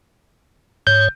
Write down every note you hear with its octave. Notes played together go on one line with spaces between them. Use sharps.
G#2 C#5 G6